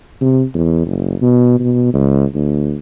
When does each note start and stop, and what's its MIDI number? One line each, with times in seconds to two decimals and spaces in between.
0.21 0.43 48
0.55 0.82 40
0.87 1.15 30
1.22 1.59 47
1.59 1.91 47
1.94 2.25 37
2.35 2.78 38